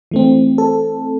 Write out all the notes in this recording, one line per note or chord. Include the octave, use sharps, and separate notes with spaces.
E3 A3 C4
A4